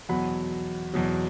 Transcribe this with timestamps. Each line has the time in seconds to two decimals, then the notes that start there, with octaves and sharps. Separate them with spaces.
0.09 E2 B2 F#3 F#5 B5
0.94 E2 B2 F#3